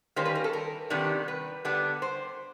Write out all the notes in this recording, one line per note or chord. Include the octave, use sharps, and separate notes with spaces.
D#3 G3 A#3 C#4 C5
B4
A#4
A4
A#4
C3 D#3 G3 B3 D4
B4
D3 G3 B3 D4
C5